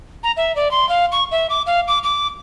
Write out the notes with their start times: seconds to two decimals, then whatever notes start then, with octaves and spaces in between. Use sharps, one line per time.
0.23 A#5
0.37 E5
0.56 D5
0.71 C6
0.89 F5
1.12 C#6
1.31 E5
1.50 D6
1.67 F5
1.88 D6
2.03 D6